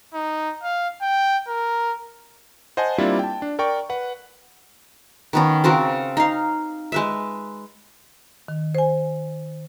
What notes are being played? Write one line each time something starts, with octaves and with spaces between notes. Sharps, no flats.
D#4
F5
G5
A#4
C5 D#5 F#5 G#5 A5
G3 A#3 C4 D4 E4 F4
G5 A5
D4
A#4 D5 G5 C#6
B4 F#5
D#3 B3 C#4
C#3 C4 F#4 A#4
D#4 F5
G#3 B4 E5
D#3
C5 G#5